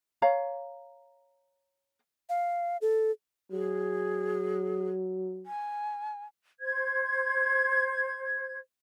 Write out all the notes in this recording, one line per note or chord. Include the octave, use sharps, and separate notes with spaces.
C#5 F5 A#5
F5
A4
F#3 G#4
G#5
C5 G#6